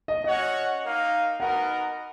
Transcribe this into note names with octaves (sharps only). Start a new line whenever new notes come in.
D#5
C#4 F#4 C#5 D#5 F#5
A#3 D#4 A#4 F5
B3 D#4 F#4 A#4 D#5 F#5